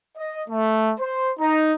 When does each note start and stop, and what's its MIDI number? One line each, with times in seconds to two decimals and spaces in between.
0.17 0.43 75
0.49 0.94 57
0.99 1.31 72
1.39 1.73 63